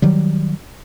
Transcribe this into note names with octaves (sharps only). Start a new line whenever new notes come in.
D#3 F#3 G3